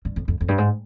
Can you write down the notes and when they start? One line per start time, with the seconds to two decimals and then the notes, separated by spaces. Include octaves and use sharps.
0.05 G2
0.16 F2
0.28 F2
0.41 F2
0.48 G2
0.58 G#2